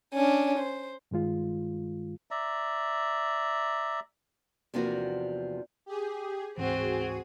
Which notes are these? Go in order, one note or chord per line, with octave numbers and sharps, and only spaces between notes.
C#4 D4
C5
G2 D#3 G#3 F4
D5 E5 A#5
E2 C3 F3 A#3 D4 F#4
G4 G#4
D1 G#2 E3 C4 F#4 G#4 D#7